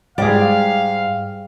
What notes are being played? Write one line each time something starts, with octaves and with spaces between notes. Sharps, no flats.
G#2 G3 G#4 D5 F5